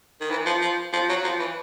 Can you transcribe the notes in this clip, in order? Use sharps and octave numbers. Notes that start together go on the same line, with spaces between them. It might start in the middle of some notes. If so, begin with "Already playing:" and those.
D#3
E3
F3
F3
F3
F#3
F3
E3